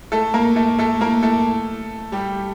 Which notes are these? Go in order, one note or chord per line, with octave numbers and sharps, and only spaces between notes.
A3 A4
A#3 A#4
A3 A4
A3 A4
A#3 A#4
A3 A4
G3 G4